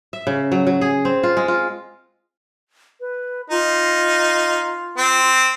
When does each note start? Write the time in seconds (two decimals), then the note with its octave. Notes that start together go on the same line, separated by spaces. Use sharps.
0.13 E5
0.27 C#3
0.52 F#3
0.67 F#3
0.81 G#4
1.05 C4
1.23 F4
1.37 G#3
1.48 F4
3.00 B4
3.50 D#4 F4
4.98 C4